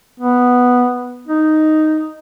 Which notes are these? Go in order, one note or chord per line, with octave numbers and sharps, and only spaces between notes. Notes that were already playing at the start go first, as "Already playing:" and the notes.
B3
D#4